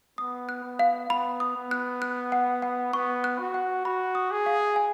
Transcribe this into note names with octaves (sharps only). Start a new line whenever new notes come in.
B3 D#6
F#6
B3
F5
B3 B5
D#6
B3
F#6
F#6
F#5
F#5
B3 C#6
F#6
F#4
F#5
F#4 B5
D#6
G#4
F5
G#5